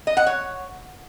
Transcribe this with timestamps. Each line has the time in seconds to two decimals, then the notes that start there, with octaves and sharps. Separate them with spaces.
0.07 D#5
0.17 F#5
0.27 C#5